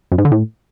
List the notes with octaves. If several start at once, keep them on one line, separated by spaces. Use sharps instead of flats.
F#2
G#2
D3
A2